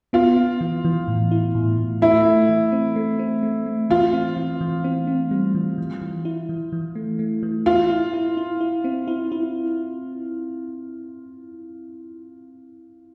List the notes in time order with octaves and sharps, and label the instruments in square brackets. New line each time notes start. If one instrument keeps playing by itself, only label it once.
[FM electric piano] B3 [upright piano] F4
[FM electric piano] B3
E3
E3
A2
E4
A2
A2
[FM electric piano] A3 [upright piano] E4
[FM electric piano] A3
E3
C4
A3
C4
A3
A3
[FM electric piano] E3 [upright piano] F4
[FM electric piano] C4
E3
E3
C4
C4
G3
E3
E3
E3
E4
E3
E3
A3
A3
E3
[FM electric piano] E4 [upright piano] F4
[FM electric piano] E4
E4
E4
E4
C4
E4
E4